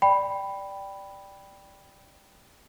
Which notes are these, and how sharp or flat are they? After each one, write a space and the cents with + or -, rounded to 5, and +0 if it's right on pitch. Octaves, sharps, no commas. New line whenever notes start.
D5 +0 G5 +0 B5 +0